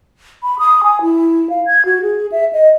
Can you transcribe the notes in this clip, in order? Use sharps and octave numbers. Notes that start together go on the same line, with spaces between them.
B5
D#6
G#5
E4
F5
G#6
F#4
G#4
E5
D#5